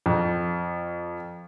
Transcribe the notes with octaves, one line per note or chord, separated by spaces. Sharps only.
F2